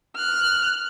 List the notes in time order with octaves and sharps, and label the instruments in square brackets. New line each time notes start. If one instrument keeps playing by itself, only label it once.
[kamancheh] F6 F#6